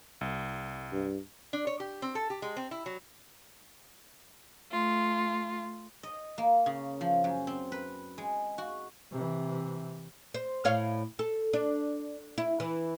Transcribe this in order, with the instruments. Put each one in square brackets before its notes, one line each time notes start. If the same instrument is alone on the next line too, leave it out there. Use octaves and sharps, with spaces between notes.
[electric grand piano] C2
[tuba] G2
[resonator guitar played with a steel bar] D4
C#5
G4
C4
A4
G4
G#3
C4
E4
F#3
[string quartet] A3 F4
[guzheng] D#5
A#3
C#3
F3
F#2
C4
B4
G#3
F#4
[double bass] C3 E3
[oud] C5
A2 C#5 F5
A4
D4
E4
E3